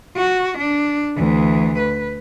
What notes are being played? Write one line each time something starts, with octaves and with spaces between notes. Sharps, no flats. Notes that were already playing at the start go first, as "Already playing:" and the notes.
F#4
D4
D2 E3
B4